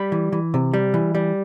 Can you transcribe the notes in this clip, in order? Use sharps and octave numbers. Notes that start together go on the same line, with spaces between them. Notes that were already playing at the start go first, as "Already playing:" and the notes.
Already playing: G3 B5
E3
E3
C3
G3
E3
G3